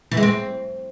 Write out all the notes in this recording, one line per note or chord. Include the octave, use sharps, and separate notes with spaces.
E3
G#3
C4